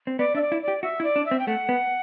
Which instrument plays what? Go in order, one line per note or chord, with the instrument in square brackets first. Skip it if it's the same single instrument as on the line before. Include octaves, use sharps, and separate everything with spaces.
[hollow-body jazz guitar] C4
[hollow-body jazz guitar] B3 [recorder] D5
[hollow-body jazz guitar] D4 [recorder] E5
[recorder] D5
[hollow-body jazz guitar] E4
[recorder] D5
[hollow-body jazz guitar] G4
[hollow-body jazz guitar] F#4 [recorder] E5
[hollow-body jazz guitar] E4
[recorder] D5
[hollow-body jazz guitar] D4
[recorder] E5
[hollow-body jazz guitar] C4
[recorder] G5
[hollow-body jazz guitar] A3 [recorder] F#5
[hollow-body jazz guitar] B3